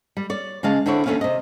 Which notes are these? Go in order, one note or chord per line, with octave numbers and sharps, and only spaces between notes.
G3
C#5 D5
C#3 G#3 F5 A5
D3 C4 D4 E4 C#5
D#2 G#3 A3 C#4 F5
C3 D#5